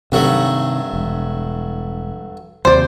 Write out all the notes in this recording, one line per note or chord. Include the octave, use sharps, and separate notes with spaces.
G2 C3 D#3 F#3 A3
E1
D#2 C3 F#3 C5 D5